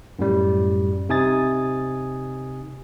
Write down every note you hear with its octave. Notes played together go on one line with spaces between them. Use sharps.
F#2 A2 G3
C3 D#4 G#5 D#6 A6